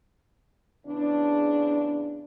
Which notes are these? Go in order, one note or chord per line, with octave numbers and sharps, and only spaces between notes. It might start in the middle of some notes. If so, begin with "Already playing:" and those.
E2 C#3 D4